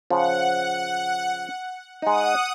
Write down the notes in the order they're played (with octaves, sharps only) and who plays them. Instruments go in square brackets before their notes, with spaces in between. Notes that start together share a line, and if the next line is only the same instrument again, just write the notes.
[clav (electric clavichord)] C#3 F3 [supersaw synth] F#5
[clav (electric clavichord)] G#3 D#4 [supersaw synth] F#5 D#6